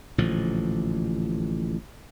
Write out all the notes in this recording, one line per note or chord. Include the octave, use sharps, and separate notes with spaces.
A1 A#2 D3 F3